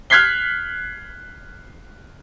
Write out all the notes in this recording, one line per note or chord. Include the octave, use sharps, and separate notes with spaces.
F6 F#6 G#6 B6 C7 G7